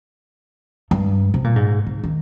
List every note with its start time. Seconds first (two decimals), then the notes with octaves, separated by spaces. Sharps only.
0.91 G2
1.34 C3
1.44 A#2
1.56 G#2
1.87 C3
2.04 D#3